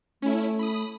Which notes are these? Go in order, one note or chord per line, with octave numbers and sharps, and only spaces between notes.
A3 C#4 E4
B5 D#6